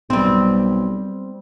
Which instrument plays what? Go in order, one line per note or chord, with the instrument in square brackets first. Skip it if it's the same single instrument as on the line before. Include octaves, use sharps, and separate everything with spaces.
[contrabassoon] B1 [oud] G3 C4